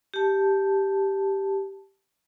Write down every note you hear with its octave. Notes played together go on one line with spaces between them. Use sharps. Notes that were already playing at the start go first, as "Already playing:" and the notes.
G4 A5